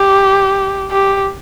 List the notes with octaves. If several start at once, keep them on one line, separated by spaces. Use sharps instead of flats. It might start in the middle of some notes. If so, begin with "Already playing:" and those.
Already playing: G4
G4